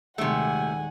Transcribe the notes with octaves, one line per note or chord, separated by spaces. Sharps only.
D#1 C3 D#3 G#3 A3 F#5 G#5